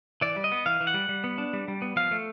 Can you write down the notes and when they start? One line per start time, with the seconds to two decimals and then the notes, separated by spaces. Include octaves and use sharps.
0.21 E3 D5
0.36 G3
0.44 D#5
0.52 B3
0.66 E3 F5
0.81 E3
0.87 F#5
0.94 G3
1.09 G3
1.24 B3
1.38 D4
1.53 G3
1.68 G3
1.82 B3
1.96 F3 F5
2.11 A3